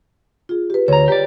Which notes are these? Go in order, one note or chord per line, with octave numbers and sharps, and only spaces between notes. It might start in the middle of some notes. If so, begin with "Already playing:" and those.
F4 G#4
G4 B4
D2 C#5 A#5
G4 D5